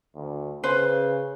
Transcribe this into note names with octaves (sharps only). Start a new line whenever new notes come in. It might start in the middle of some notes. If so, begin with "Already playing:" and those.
D2
C#3 B4 C5